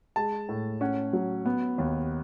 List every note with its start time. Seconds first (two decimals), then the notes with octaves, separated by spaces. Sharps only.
0.16 G#3 A5
0.49 A2
0.81 C#4 F#5
1.13 F#3
1.45 B3
1.78 D#2